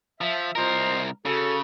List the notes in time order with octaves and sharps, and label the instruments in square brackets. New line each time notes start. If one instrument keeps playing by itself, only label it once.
[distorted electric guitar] F3 [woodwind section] E5
[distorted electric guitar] C2 A#4 [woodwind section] F4 C5 D#5
[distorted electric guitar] C#3 [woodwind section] F#4 A4